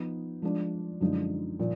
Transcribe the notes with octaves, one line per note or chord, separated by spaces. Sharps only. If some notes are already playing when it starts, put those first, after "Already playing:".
Already playing: F3 B3 D#4
F3 G#3 D4
F#2 D3 F3 G#3 D#4
A#2 F3